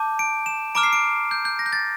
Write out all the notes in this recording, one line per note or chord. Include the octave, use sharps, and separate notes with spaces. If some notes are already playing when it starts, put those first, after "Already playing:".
Already playing: A5 D6 G6
D7
E7
A#5 D6 F6 D7
C7
D7
G6
G6
A#6
G6
A6